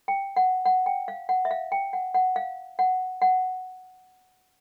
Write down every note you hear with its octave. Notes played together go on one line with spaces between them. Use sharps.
G5
F#5
F#5
G5
F5
F#5
E5
F5
G5
F#5
F#5
F5
F#5
F#5